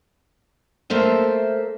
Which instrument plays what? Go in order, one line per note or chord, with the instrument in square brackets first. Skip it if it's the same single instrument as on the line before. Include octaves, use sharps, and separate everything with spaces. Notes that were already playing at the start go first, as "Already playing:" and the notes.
[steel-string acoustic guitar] A3 A#3 A4 C5 E5